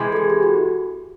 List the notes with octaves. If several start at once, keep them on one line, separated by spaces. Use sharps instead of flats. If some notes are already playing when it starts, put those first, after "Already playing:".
Already playing: C3 E3 G#3
A4
G#4
G4
F#4